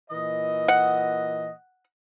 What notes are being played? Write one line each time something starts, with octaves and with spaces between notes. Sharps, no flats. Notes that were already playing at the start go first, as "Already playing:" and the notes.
A#2 E3 D#5
F#5